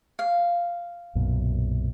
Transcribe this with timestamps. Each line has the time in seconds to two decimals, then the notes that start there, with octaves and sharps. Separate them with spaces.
0.19 F5
1.15 B1 F#2 A#2